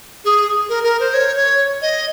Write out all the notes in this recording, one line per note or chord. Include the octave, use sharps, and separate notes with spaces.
G#4
A#4
A#4
C5
C#5
C#5
D#5